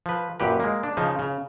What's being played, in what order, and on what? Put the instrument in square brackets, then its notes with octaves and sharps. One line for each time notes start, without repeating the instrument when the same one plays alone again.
[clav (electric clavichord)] F3 B4
F#2 A#2 G4 B4
G#3 A#3
D4
C#3 F3 D#4
C#3